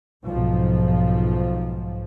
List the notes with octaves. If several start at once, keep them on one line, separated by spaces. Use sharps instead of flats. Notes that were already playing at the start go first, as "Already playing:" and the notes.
B1 G#2 F3